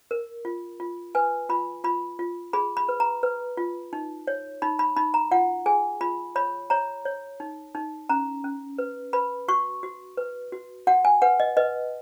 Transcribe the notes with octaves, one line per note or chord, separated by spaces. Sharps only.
A#4
F4
F4
B4 G#5
F4 B5
F4 B5
F4
G#4 B5
B5
B4
A#5
B4
F4
D#4
C#5
D#4 B5
B5
D#4 B5
A#5
F4 F#5
G#4 G#5
F4 B5
C#5 B5
C#5 A#5
C#5
D#4
D#4
C#4 A#5
C#4
B4
B4 B5
F#4 C#6
F#4
B4
F#4
F#4 F#5
G#5
B4 F#5
D#5
B4 D#5